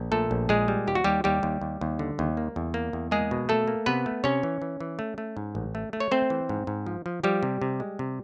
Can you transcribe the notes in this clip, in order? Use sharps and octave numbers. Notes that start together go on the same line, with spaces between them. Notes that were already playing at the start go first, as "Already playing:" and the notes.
Already playing: A#1
A#2 A3 A4
A#1
A#2 G#3 G#4
G3
D#2 G4
F#4
D#2 G3 G4
D#2 G3 G4
D#2
D#2
D#2
D3
D#2
A#3
E2
A#3
E2
G#3 A#3 G#4
B2
A3 A#3 A4
A#3
C3 B3 B4
A3
C3 C#4 C#5
E3
E3
E3
A3
A3
G#2
A1
A3
A3
C#5
A3 C4 C5
E3
G#2
G#2
F3
F3
F3 G3 G4
C3
C3
G#3
C3